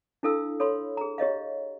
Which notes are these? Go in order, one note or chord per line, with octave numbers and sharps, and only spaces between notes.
D4 E4 A4 F5 E6
A4 C#5 F5 B5 C6
G#4 A#5
G4 C#5 D#5 F5